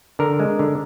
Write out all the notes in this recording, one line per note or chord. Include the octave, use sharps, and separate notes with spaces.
D3 A#4
G#3
D3